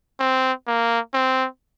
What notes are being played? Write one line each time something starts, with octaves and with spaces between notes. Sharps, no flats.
C4
A#3
C4